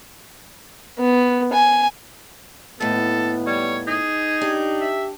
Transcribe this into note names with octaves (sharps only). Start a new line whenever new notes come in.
B3
G#5
D#2 A2 B3 A4
G3 C#5
D#4 G#4
D4 G4
E5